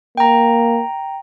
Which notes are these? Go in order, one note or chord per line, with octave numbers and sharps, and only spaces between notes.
A#3 G5 A#5